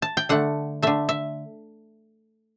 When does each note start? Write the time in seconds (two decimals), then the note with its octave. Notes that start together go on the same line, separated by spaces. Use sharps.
0.02 A5
0.17 G5
0.29 D3 A3 F#5
0.82 D3 A3 E5
1.09 E5